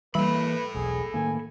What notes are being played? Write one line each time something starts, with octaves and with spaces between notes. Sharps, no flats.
E3 G3 A#3 A4 B4 B5
E1 B1 G#4
A2 D#3 A#3 G#5